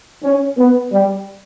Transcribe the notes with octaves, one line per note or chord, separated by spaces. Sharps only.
C#4
B3
G3